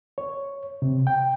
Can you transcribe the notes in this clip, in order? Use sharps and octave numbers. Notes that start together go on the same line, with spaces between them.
C#5
C3
G5